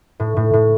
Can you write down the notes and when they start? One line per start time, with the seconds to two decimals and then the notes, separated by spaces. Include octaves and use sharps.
0.20 A2
0.37 A2
0.53 A2